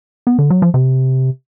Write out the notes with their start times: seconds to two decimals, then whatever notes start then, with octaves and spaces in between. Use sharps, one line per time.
0.27 B3
0.38 D3
0.50 F#3
0.62 F3
0.74 C3